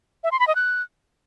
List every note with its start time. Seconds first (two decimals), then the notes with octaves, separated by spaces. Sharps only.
0.24 E5
0.32 C6
0.40 B5
0.47 D#5
0.55 F#6